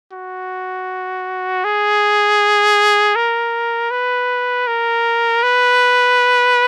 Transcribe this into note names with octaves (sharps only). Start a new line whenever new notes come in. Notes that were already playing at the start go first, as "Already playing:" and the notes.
F#4
G#4
A#4
B4
A#4
B4